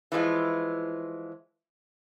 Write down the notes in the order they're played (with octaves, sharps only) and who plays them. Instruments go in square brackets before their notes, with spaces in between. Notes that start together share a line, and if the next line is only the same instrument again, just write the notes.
[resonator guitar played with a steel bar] E3 F3 G#3 F4